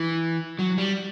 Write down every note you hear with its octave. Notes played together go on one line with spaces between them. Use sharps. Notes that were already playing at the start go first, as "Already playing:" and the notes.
Already playing: E3
F#3
G3